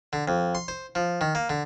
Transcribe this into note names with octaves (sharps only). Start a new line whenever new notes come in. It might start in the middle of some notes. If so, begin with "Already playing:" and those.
D3
F2
C6
C5
F3
D#3
A#3
D3